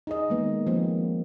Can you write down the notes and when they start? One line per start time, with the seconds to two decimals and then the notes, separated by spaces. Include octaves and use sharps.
0.07 D#4 G#4 D#5
0.30 D#3 G#3 A#3 B3
0.67 F3 A#3 C4 C#4